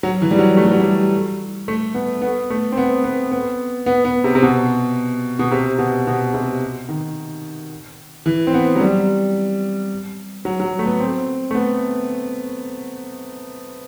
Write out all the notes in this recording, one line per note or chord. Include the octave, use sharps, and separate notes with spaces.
F#3
E3
G3
F#3
A3
G3
F#3
G3
A3
B3
B3
A3
C4
B3
B3
B3
B3
B3
C3
C3
B2
B2
C3
B2
B2
C3
D#3
E3
C4
B3
F#3
G3
F#3
F#3
A3
B3
C4
A3
B3